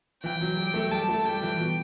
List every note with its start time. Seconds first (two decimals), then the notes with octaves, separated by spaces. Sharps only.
0.24 E3 G5
0.41 F#3
0.57 G3
0.74 A3
0.91 G3 A5
1.09 A3
1.25 G3 G5
1.42 E3
1.59 B2